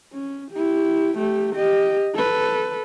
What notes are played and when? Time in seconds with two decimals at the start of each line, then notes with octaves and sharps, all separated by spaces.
0.13 C#4
0.52 E4 G4
1.18 A3 G4
1.55 G4 D#5
2.15 A4 B4